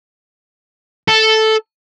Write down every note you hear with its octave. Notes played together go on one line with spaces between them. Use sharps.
A4